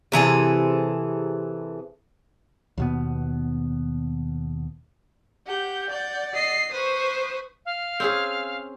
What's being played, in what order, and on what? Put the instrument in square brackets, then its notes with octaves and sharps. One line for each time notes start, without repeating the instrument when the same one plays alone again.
[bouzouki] C3 E3 G#4 A4
[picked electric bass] D#2 B2 B3
[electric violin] G4 [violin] F#5 G6
[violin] D5 F#5 [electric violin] G6
[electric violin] D#5 C7
[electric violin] B4 C5 [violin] C#6 D#6
[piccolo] F5
[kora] C4 C#4 G#4